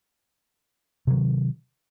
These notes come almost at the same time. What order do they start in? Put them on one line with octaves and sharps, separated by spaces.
C3 F#3 D#3